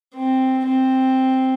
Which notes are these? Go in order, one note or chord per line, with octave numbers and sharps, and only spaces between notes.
C4
C4